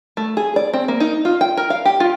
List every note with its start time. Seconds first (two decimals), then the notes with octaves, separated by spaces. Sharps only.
0.17 A3
0.37 G#4
0.56 D5
0.73 C4
0.88 A#3
1.00 D#4
1.25 F4
1.41 G5
1.57 A#4
1.70 F5
1.85 G4
2.00 F4